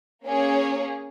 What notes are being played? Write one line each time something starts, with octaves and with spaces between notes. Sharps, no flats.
A#3 C#4 G#4 C#5